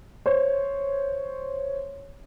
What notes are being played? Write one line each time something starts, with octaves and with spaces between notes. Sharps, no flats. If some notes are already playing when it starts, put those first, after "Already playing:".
C5 C#5